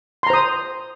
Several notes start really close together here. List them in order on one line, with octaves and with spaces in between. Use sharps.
C6 A#5 C5 D#6